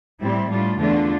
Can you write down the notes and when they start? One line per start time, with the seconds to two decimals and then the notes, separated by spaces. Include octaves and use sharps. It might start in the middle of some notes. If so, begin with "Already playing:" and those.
0.20 A2 G3 C4 E4
0.50 A2 G3 D4 F4
0.79 E2 D3 A3 D4 F4